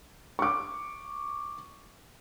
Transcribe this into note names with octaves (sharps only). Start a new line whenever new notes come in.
C#6 D6